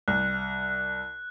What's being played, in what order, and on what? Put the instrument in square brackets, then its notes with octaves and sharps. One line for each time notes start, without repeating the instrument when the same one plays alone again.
[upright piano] C2 [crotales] F#6